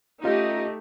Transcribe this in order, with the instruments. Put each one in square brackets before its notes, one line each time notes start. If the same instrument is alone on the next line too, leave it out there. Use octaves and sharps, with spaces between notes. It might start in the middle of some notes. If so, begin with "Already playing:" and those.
[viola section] A3 D#4 G4 [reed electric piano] C#4 F4 A4 [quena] D#5